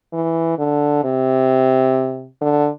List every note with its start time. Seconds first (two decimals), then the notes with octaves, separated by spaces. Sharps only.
0.13 E3
0.58 D3
1.04 C3
2.41 D3